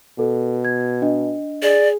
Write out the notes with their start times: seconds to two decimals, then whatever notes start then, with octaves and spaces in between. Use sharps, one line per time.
0.19 B2 A4
0.65 G#6
1.02 D4 D#5
1.63 G#4 D5